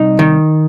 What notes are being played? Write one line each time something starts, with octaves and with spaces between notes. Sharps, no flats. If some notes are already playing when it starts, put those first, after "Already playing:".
Already playing: C2 D#4
D#3